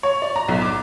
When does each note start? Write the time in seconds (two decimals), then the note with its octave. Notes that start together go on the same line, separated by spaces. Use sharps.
0.03 C#5
0.22 D5
0.36 A#5
0.48 B1
0.62 D6